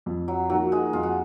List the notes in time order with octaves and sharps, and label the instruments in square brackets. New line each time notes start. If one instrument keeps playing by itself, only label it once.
[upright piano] F2
[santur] F#3
[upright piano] F3 A#3 D#4 F#4 [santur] F#3
[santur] G#3
[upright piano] F2 [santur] F4
[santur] F#4